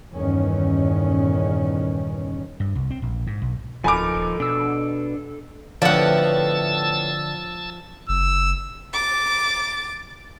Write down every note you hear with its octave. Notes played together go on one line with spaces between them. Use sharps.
E2 G2 A#2 D#3 C#4
G2
C2
C4
A#1
G#2
B1
D1 F3 D#4 A4 A#4 G#5 B5 D6
D#1
B2 D4 E6
A2 D3 F3 B3 D5 F#5 A5 E6
F#1 E6
D6 A6